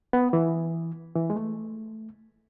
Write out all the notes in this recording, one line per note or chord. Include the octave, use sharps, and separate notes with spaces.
B3
E3
E3
G#3
A3